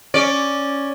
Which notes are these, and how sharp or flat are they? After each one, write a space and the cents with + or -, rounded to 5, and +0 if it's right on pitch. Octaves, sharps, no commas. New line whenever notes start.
C#4 +0 D5 +0